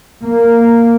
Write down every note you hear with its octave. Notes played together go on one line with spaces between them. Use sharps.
A#3